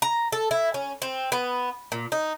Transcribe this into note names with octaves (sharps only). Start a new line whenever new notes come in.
A#5
A4
E4
C#4
C4
B3
A#2
D#4